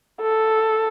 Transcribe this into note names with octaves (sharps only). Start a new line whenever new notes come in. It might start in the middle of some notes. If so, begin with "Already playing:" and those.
A4